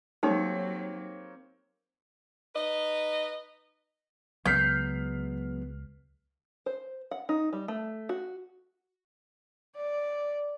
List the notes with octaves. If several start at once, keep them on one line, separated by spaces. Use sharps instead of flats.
F#3 A#3 C4 D#4 G4 A4 C#5
D#4 B4 D#5
C#2 F#3 G#3 B3 F6 G6 B6 C7
C5
F#5
D#4
G3
A3
F#4
D5